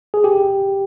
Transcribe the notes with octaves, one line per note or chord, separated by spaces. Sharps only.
G#4
G4